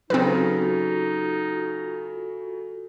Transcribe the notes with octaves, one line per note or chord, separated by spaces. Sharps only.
C#3 F#3 C4 D#4 F4 F#4 A4 B4